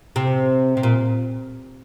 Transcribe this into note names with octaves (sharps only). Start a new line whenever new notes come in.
C3
C3
A#2